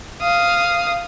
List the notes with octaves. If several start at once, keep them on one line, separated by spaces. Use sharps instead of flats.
F5 D#6